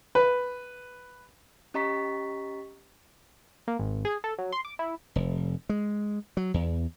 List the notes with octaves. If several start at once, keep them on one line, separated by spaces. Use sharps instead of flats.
B4
C#4 G4 D#5 A#5 C#6 B6
A#3
G#1
G#4
A4
F#3
C6
D6
E4
F1
G#3
F#3
E2